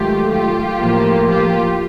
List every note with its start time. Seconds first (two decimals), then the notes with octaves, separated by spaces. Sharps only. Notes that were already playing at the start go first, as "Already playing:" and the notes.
Already playing: G#2 D#3 F#3 A3 F4 G4
0.31 F4 G4
0.79 A2 F3 A#3
1.27 F4 G4